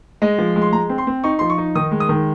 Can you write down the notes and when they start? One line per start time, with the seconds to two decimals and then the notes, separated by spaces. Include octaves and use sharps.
0.22 G#3 D#5
0.39 F3
0.56 G#3
0.62 C6
0.73 G#3 A#5
0.90 C4
0.98 C6
1.07 C4
1.24 D#4 C#6
1.39 F3 C6
1.50 C#6
1.58 D#4
1.75 D#3 D#6
1.92 G#3
2.00 D#6
2.09 D#3